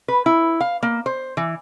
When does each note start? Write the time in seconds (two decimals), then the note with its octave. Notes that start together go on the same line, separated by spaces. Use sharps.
0.08 B4
0.26 E4
0.61 F5
0.83 A#3
1.06 C5
1.37 E3